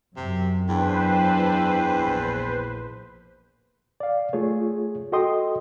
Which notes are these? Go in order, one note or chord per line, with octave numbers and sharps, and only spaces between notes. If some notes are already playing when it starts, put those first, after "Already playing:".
F#2 C3
E2 D4 E4 B4 C5 G5
A#1
D5 F5
A3 F4 G#4 C#5
F#4 A4 D#5 G5 C6 D#6